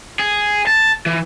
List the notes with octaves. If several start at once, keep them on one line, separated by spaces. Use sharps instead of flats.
G#4
A5
E3